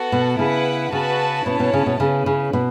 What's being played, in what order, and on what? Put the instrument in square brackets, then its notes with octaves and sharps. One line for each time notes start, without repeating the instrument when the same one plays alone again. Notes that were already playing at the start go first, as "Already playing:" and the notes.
Already playing: [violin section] B3 F#4 A4 F#5 A5
[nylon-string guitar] B2
[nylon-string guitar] C#3 [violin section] E4 B4 F#5
[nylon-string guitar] C#3 [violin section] F#4 B4 A5
[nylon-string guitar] B2 [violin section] C#4 E4 C#5 A5
[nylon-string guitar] B2
C#3
B2
[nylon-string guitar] C#3 [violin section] C#4 E4 B4
[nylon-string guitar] C#3
B2